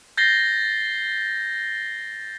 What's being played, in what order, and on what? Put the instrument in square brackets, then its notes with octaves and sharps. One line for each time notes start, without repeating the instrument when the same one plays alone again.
[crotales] G6 A6 A#6 C7 G7